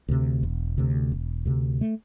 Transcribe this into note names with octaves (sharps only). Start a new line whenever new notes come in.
D2 C3
E1
D2 C3
E1
D2 C3
A3